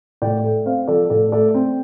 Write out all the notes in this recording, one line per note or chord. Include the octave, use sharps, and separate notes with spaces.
A2 D5 G5
A3
C4 C5 F5
F3 A4 D5
A2 A4 D5
A3 A4 D5
C4